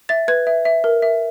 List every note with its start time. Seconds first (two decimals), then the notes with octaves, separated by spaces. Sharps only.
0.09 E5 A6
0.28 B4 G#6
0.47 E5
0.65 E5
0.84 A#4
1.02 E5